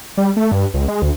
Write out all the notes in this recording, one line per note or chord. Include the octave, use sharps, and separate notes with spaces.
G3
A3
G2
C#2
G#3
D2